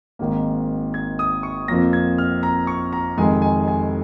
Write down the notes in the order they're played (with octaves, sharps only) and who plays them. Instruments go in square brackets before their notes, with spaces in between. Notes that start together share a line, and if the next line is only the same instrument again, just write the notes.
[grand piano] G#1 G#2 D#3 A#3
G#6
D#6
C#6
F2 F3 A#3 A#6
G#6
F6
A#5
C#6
A#5
F1 F2 D#3 G#3 G#5
G#5
G#5